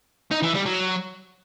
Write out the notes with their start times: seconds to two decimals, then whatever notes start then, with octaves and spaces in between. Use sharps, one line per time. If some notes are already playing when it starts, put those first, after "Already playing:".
0.31 D#4
0.43 E3
0.54 G3
0.66 F#3